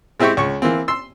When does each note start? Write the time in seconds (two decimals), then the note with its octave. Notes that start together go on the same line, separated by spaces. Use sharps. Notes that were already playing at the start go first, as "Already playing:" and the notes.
0.20 G#3 C4 E4 G4 G5 C#6
0.37 C#2 C#6
0.62 E3 A#3 C4
0.88 C6 E6